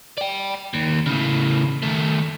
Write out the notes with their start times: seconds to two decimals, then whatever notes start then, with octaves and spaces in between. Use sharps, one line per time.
0.18 D5 G5
0.74 D#2
1.06 A2 C#3
1.82 D#3 A3